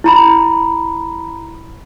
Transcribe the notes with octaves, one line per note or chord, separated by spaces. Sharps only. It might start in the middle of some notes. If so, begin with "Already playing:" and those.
E4 A#5 B5